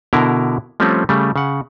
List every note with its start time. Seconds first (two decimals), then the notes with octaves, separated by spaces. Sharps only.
0.13 B2 D3 E4 A#4 A#5
0.80 F3 G3 A3 C4 C#4
1.09 C#3 G3 A3
1.36 C#3 F#5